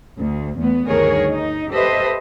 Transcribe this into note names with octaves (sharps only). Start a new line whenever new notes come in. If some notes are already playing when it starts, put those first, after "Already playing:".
D2
E2 A3 B3
D2 G2 D#3 G#4 A#4 C#5
D#4
G4 A4 B4 C5 D#5 E5